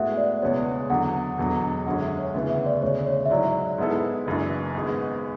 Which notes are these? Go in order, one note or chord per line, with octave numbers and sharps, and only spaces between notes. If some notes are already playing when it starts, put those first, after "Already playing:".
Already playing: A2 G#3 B3 F#4 B4 E5 F#5
D5
E1 E2 C#3 G#3 B3 C#5
E2 D3 F#3 F#5
E1 E2 D3 F#3
F#2 D3 G#3 C#4 F#5
E5
C#5
D2 C#3 E3 B3 E5
E5
D5
E1 D2 C#3 C#5
C#5
E5
G#2 F#3 C#4 E4 D5
G#2 G#3 B3 E4 A4
F#1 F#2 E3 G#3 D4
G#1 G#2 G#3 B3